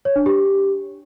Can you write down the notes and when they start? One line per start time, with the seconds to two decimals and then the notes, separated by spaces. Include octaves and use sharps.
0.05 C#5
0.16 D4
0.26 G4